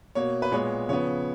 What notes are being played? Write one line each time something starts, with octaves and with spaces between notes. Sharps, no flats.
B2 A#3 C#5
B4
A#2 G#3 B3 C#5
C#3 F3 B3 C#5